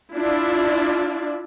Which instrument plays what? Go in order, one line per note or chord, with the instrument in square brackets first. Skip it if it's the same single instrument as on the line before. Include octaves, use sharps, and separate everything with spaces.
[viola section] D4 E4 F4 D5